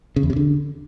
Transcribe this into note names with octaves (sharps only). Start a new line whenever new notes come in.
C#3
E2
C3
D3